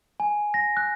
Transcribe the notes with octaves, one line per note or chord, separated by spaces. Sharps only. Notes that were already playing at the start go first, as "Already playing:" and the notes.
G#5
A#6
F#6